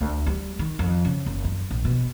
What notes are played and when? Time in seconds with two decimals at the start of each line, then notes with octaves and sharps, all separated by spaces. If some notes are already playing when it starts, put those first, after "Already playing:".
0.01 D2
0.26 G3
0.59 D#3
0.79 F2
1.05 C#3
1.26 F#1
1.44 F#2
1.71 A#1
1.85 B2